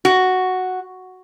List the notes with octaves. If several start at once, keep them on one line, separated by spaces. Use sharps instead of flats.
F#4